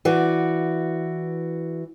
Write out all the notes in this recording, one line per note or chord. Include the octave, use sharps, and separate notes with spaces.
E3 F#4 D5